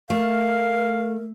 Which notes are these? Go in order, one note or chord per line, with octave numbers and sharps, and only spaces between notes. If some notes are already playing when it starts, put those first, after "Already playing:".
A3 A#4 F5